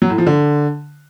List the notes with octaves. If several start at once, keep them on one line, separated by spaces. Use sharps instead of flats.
F#3
A2
F3
D3